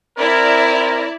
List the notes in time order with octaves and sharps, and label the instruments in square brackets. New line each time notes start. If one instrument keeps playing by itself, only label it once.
[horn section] C4 A#4 [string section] E4 D5